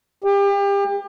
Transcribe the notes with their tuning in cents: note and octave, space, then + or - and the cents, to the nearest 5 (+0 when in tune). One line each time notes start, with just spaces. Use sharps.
G4 +30